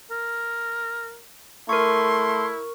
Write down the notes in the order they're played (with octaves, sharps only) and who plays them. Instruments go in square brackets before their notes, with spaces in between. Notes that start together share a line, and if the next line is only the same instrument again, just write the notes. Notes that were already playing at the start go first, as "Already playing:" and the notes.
[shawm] A#4
[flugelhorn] A3 [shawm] E4 [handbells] A#4 C#6 [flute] C6